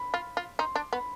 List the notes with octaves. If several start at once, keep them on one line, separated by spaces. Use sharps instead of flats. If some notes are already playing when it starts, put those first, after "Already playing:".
Already playing: B5
F4
F4
D#4 C6
D4
B3 B5